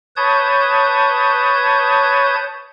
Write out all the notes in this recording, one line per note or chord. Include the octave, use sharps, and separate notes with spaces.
B4 C#5 A5 D#6 G6 G#6